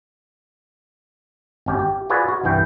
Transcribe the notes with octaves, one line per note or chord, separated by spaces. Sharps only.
G#1 C#4 G4
G4
F4 F#4 G#4 B4 C#5 D5
F#4
C2 G2 E3 G5